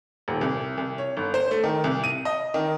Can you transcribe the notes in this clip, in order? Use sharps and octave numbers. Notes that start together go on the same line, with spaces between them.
D#1
C2
C2
C#5
G1
C5
A3
D#3
C2
D#7
D#5
D#3